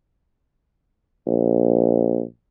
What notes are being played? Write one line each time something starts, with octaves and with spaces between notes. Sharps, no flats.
A#1